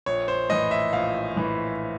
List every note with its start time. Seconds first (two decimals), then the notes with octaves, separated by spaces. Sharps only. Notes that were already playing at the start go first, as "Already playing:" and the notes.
0.06 A#1 C#5
0.28 C5
0.49 A2 E3 D#5
0.71 E5
0.93 A#1 F5
1.36 A2 E3